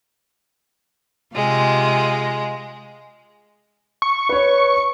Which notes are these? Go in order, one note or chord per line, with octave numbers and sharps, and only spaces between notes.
C3 G#3 F4 F5
C#6
B4 C#5